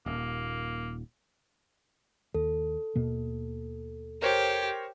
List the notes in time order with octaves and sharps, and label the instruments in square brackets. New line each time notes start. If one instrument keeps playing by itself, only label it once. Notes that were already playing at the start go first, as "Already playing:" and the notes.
[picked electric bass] D#1 [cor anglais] A#3
[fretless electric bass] D#2 [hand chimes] A4
[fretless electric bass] D#2 B2 A#3
[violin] G4 [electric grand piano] A#4 C5 C#5